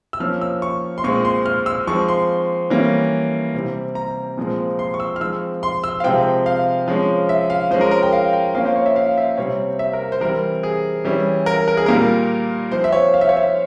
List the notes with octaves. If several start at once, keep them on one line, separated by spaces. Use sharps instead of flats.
E6
F3 A#3 C#4 F6
E6
C#6
C6
A#2 G#3 C4 C#6
C6
F6
E6
F3 G#3 C4 C#6
C6
E3 G3 A#3 C#4
C3 G3 C4
A#5
A#2 F3 G#3 C4
C6
C#6
E6
F6
F3 G#3 C4 E6
C6
E6
F5
C3 F3 G#3 C4 G5
F5
F3 G#3 C#4
E5
F5
F3 G#3 C#4 C5
A#4
A#4
G5
F5
G5
F3 A#3 C#4 F5
C5
C#5
E5
F5
E5
C3 G3 C4 C#5
E5
A#4
C5
E3 G3 C4 A#4
G#4
E3 G3 C#4
A#4
A#4
G#4
A#2 G3 A#3 A#4
F3 C4 C5
E5
C#5
F5
E5
C#5
E5